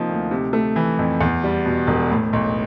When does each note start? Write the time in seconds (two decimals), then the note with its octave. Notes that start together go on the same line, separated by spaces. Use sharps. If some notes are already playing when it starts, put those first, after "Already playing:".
Already playing: C3 F3 A#3 D#4
0.09 D2
0.31 C3
0.53 A3
0.76 E3
0.99 F2
1.21 E2
1.44 G3
1.66 B2
1.87 E1
2.11 A2
2.33 B1